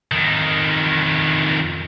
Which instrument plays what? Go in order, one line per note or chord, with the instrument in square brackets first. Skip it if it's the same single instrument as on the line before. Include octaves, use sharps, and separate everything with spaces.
[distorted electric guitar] F2 D#3